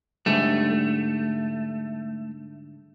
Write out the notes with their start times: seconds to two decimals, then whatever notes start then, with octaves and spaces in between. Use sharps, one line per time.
0.26 G#2 D3 G3 A3